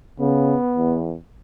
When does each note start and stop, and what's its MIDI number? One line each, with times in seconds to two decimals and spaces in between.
0.20 0.56 49
0.20 1.07 59
0.76 1.16 40